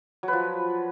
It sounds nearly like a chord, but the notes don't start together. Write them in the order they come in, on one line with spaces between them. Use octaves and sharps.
F#3 B4 F3